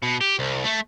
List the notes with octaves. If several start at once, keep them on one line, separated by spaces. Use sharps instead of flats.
B2
G4
C2
A3